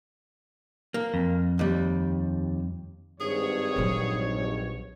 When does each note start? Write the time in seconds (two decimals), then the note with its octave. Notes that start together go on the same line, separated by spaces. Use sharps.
0.94 A#3
1.14 F2
1.59 D#2 G3
3.21 G#1 G2 G#4 C#5
3.76 A#1 F#3